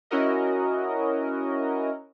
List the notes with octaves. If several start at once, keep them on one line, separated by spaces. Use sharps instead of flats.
C#4 E4 F#4 A#4 D#5